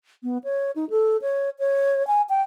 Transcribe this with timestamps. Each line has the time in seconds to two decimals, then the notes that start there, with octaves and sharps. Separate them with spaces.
0.23 B3
0.44 C#5
0.76 D#4
0.90 A4
1.22 C#5
1.59 C#5
2.07 G#5
2.29 G5